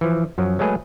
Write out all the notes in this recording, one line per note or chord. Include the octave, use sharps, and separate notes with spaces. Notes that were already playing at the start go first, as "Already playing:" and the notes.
E3 F3
F#2 F3 F#3
F#3 G#3 A3 G#4 B4 D#5